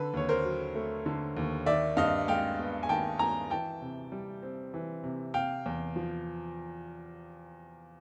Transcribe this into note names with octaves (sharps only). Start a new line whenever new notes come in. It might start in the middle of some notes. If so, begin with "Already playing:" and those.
Already playing: D3 A4 B4
D#2 C#5
A#4 C5
F#3
A3
D3
D#2
D#3 D5 E5
G2 D#5 F5
G#3 F5 G5
B3
G#5
D#3 G5 A5
G2 G#5 A#5
E3 G5 A5
C3
G3
C4
E3
C3
C3 F5 G5
E2
F3